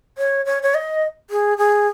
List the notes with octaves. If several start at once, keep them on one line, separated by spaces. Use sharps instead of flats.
C#5
C#5
C#5
D#5
G#4
G#4